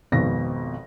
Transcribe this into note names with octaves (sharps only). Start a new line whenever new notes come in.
G#1 F2 B2 A#6